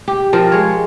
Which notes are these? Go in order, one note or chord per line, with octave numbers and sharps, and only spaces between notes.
G4
F3 C4 A#4
G#3 C#5